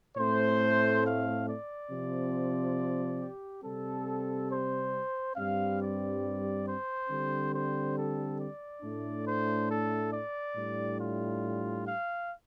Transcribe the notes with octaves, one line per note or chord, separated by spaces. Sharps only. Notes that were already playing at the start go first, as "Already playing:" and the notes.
A2 A3 C4 C5
F5
D5
C3 F3 C4
G4
C3 G3 C4 A4
C5
G2 G3 C4 F5
D5
C5
D3 G3 C4
C5
A4
D5
A2 A3 D4
C5
A4
D5
A2 G3 D4
F4
F5